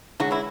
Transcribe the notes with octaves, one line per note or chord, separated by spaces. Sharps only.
D3 F#3 G#3 C#4 F#4
E3 E4